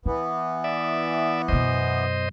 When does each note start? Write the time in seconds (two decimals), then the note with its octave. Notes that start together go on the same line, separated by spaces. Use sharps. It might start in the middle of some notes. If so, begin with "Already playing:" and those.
0.06 E3 B3 E4
0.64 D5 E5
1.48 F#2 B2 C5 D#5